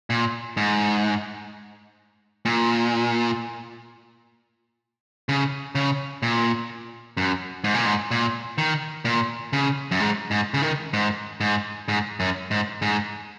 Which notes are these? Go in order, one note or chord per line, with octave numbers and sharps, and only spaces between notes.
A#2
G#2
A#2
C#3
C#3
A#2
F#2
G#2
A#2
G#2
A#2
D#3
A#2
C#3
F#2
G#2
G#2
C#3
D#3
G#2
G#2
G#2
F#2
G#2
G#2